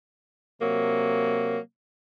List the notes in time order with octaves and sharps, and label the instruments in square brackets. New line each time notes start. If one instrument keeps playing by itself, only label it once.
[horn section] C3 F#3 A#3